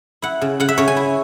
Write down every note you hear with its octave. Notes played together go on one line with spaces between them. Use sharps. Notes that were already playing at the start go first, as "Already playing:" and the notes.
E4 F#5
C#3
C#3 F#5
E5
C#3 C#5
G#5
E4